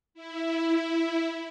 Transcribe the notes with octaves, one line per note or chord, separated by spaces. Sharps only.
E4